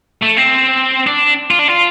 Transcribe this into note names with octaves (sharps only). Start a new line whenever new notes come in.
A3
C4
D4
F4
D4
F4